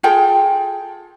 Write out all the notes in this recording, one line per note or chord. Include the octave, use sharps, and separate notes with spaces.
F4 G#4 A4 G5